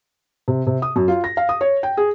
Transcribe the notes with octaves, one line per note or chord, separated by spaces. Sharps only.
C3
C3
D#6
F#2
F4
A#6
F5
D#6
C#5
G5
G#4